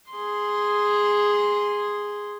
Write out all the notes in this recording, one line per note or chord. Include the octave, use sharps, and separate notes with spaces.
G#4 C6